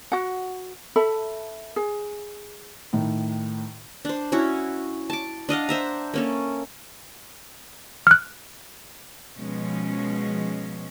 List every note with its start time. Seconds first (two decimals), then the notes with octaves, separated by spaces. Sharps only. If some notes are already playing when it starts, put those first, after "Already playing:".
0.12 F#4 F#5
0.96 A4 E5 B5
1.76 G#4
2.93 A2 D#3
4.05 D4 C5
4.32 C#4 E4 F#4 C#5
5.10 A5 D6
5.49 D4 D#5 F5 F#5
5.69 C5 E5 A#5
6.14 A#3 C#4 A4
8.07 F6 F#6
9.38 B2 F3 G#3 C#4